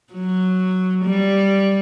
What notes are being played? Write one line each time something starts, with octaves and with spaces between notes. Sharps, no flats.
F#3
G3